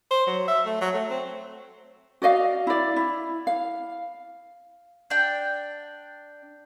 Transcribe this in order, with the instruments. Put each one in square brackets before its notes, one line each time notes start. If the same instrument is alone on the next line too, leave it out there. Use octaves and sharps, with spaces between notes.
[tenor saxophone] C5
F#3
E5
A3
F#3
A3
C4
[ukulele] F#4 D5 D#5 F5
E4 D5
E4
F5
[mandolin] D4 G5